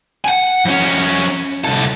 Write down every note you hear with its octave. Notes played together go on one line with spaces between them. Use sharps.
F#5 G#5
F2 C#4
C2 A4